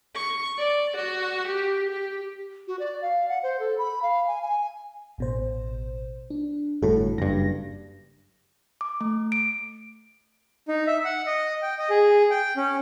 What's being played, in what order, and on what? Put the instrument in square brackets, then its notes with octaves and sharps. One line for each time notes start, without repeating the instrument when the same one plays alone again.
[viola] C#6
D5
F#4
G4
G4
[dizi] F#4
D5
F5
F#5
C5
A4
B5
F5
G#5
G#5
[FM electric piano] A1 B2 C5
D4
[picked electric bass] G1 A2 [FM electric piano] F#4 A4
[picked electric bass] F#1 G2 [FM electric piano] A#6
[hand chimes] D6
A3
D7
[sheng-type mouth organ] D#4
E5
F#5
D#5
G5
D#5
G#4
G5
C#4